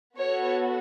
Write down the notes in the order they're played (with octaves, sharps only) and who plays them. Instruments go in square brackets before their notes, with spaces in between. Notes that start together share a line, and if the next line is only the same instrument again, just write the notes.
[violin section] B3 F#4 A4 C#5